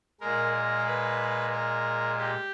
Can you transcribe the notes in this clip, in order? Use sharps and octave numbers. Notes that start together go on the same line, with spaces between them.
A#2 G#3 A#4
A#4
B4
A#4
G4